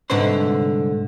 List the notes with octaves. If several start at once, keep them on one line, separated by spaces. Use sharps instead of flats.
C2 G#2 D3 B4 C5 C6